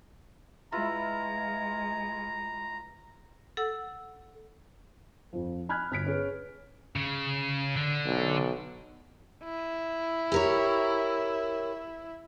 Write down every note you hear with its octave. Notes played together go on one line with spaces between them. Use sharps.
G#3 E4 F4 B4 A#5
A4 F#5 E6
F2 F3
G#5 B5 F6 F#6 G#6
G1 F6 B6 D7
C#4 G#4 B4
C#3
D3
B1
E4
G4 A#4 C#5